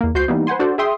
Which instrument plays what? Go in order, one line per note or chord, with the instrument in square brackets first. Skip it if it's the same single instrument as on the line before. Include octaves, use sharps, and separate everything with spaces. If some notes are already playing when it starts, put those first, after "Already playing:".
[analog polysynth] E2 A#3
C#2 F#4 C5 G6 C7
E3 G3 A#3 B3 D#4
B4 C5 F#5 G#5 C6
D4 F#4 A4 C5 D5
G#4 E5 G5 C6 D#6